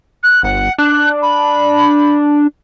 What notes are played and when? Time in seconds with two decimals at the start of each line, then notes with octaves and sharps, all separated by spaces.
0.23 F#6
0.43 G1 F#5
0.78 D4 F#6
1.22 B5